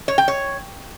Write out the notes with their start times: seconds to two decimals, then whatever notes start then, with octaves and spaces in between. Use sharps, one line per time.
0.08 C#5
0.18 G5
0.28 C#5